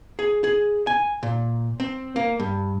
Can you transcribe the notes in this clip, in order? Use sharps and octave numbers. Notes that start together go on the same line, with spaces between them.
G#4
G#4
G#5
A#2
C4
A#3
G2